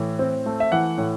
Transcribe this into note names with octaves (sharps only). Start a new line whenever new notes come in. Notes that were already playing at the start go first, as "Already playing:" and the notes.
Already playing: A2 E3
C4
A3
E5
E3 F#5
A2